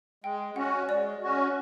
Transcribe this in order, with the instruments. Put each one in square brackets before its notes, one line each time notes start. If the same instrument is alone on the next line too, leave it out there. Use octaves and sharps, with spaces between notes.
[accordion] G#3 [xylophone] G5
[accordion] C#4 F#4 [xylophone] F#5
[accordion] G#3 [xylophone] D5
[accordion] C#4 F#4